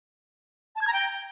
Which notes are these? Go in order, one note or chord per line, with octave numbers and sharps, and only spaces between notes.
A5
G#6
A#5
G5